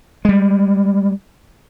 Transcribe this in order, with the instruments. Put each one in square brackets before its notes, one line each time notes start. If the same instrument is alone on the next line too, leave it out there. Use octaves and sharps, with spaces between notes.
[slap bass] G3 G#3